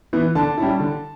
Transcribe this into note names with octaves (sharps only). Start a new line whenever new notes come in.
E3 B3 E4
D3 A5
G3 C#4 E4
D3